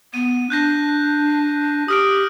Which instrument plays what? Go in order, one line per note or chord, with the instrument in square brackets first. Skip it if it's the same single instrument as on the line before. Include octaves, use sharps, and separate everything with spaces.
[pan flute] B3 [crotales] D#7
[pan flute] D4 [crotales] F#6 G6 A#6
[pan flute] G4 [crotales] D#6 F6 D7